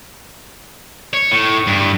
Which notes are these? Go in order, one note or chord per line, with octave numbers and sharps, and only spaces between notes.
C#5
A2
G2